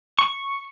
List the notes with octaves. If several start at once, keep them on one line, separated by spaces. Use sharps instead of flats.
C#6